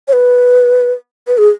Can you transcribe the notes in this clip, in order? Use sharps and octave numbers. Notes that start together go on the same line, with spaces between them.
C#5
B4
B4
G#4